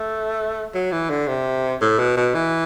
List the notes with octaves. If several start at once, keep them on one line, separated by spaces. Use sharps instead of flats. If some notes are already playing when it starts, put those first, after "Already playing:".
Already playing: A3
F#3
E3
D3
C3
A2
B2
B2
E3